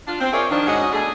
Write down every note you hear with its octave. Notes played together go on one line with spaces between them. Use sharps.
D4 F4
C4
F4 G#4 A#4 C#5 D5 E5
D#3 F3 D4
G#2 G#3 C#4 F#4 D#5
B2 A3 D4 G#4